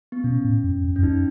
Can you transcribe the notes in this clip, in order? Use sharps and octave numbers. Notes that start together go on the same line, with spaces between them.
B3
B2 C#4
A2
F#2
F#2
C#4
E2
F#2 D#4